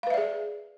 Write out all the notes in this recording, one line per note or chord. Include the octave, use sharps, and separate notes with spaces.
G#4 B4 D5 E5 F5